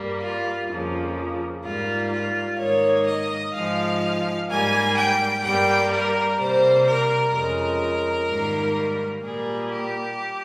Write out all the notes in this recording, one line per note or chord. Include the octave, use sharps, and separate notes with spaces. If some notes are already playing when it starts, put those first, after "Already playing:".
Already playing: G2 G3 A#3
F4
F2 C#3 F3 A#3
G#2 G3 A#3 F4
F4
G#2 D#3 A#3 C#5
D#5
G#2 F3 G#3 F5
G#2 G3 A#3 G#5
G5
G2 G3 A#3 G5
A#4
C3 G3 A#3 C5
A#4
F2 C#3 G#3 A#4
G#2 D#3 G3 A#3
A#2 G3 A#3 G#4
G4